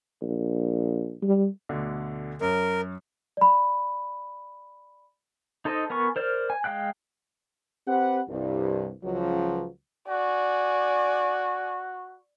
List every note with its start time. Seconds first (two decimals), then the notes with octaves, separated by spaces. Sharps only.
0.22 A#1
1.22 G3
1.69 D2 B2 D3
2.41 F#2 C#4 A#4
3.37 D5 B5
5.65 D#4 A4 C5 D#5
5.90 B3 A#4 G#5 C#6
6.16 A#4 C5 D5 F6
6.50 G#5
6.64 G#3 F5 G5 F#6
7.87 C4 G4 B4 F#5
8.29 C2 G2
9.03 C#2 F3 F#3
10.08 F#4 D5 G#5